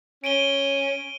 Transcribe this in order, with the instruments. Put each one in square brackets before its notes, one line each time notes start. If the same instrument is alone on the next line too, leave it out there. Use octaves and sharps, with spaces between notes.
[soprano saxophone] C#4 [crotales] D7 D#7 G7